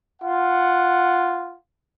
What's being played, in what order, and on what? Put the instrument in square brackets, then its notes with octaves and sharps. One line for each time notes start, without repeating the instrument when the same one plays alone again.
[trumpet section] F4 F#5